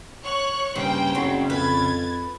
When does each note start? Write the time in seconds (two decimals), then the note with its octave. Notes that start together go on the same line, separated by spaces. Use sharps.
0.22 C#5 C#6 F#6
0.76 G2 C#3 A#3 C5 G5
1.15 F#1 F#3 C4
1.50 F2 B4 G#6 A6